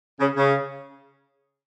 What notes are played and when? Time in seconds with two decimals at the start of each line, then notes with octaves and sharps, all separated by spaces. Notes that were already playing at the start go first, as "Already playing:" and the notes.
0.20 C#3
0.37 C#3